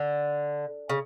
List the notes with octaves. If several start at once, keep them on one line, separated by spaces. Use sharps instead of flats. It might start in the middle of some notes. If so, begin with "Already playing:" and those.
Already playing: D3
C#3